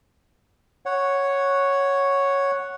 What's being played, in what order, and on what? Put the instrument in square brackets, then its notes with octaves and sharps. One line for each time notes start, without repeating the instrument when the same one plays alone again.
[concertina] C#5 F#5